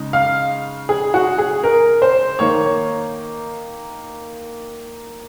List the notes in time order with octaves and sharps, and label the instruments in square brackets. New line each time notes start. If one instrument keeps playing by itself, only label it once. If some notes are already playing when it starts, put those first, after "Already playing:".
Already playing: [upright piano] C#3 G#3 D#4
F5
G#4
F#4
G#4
A#4
C5
D#3 A#3 D#4 C#5
C#5